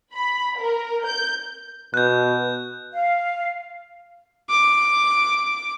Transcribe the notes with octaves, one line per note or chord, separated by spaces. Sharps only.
B5
A#4
G6
B2 F#6 G6
F5
D6